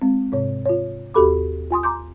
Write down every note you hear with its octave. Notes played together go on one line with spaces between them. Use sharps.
G#3 C4
G#2 C3 C#5
F4 C#5
D#2 F#4 G4 A4 B5 D6
F4 G#5 C6 D#6
A#5 C6 D6 G6